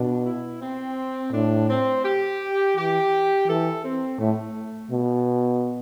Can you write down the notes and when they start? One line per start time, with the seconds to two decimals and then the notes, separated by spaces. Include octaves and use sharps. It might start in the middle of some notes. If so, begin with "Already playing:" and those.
Already playing: B2 D4
0.25 E4
0.61 C4
1.32 A2 D4
1.69 C4
2.04 G4
2.77 E3 G4
3.48 E3 A4
3.84 C4
4.19 A2 A3
4.91 B2